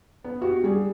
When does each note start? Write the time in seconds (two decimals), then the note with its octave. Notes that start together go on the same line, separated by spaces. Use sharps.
0.24 B3
0.42 F#4 G4
0.64 G3 G#4